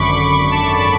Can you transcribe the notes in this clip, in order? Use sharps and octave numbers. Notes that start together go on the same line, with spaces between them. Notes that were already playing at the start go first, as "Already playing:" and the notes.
Already playing: G#1 F#2 D3 B5 C#6 D6
D6
C#6
A5